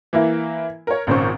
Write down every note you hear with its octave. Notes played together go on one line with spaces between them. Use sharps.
E3 A#3 E4
A#4 C#5
G#1 A#2 C#3 C#4 C5 C#6